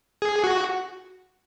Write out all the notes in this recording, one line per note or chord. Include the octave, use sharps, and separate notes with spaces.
G#4
F#4